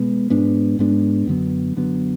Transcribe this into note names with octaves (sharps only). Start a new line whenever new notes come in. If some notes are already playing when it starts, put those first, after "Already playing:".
Already playing: B2 G#3 B3
G#2 G#3 B3 D4
G#2 G#3 B3 D4
F#2 D3 F#3 B3
F#2 D3 F#3 B3